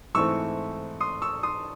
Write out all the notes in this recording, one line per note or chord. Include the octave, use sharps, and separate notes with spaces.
G#2 E3 A3 C4 C#6 E6
C6 D#6
C#6 E6
C6 D#6